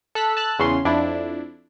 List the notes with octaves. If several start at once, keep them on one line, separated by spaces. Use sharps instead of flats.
A4 E6 F#6 B6
A5 E6 F#6
E2 C#3 C#4 C6
F2 D4 E4